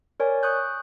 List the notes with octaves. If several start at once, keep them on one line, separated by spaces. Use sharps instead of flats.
A#4 C#5 D5 G#5
C#6 D#6 F#6 G6